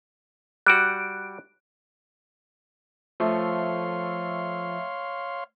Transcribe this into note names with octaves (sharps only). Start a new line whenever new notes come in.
G3 F#4 F#6 D7
F3 A3 C#5 F5 C6